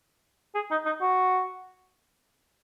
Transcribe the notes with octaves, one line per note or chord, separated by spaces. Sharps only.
G#4
D#4
D#4
F#4